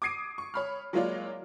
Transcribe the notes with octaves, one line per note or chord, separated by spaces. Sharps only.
D6 D#6 G#6 C7 D7 D#7
C#6
C#5 B5 F6
F#3 G#3 A#3 F4 C#5 D5